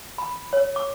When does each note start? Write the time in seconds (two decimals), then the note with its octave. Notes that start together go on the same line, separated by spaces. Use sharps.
0.18 B5
0.53 C#5
0.76 D6